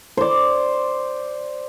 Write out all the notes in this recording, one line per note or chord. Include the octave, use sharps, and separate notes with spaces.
C5 D5